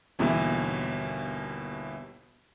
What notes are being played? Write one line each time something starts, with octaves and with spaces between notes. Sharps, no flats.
G1 D#2 B2 E3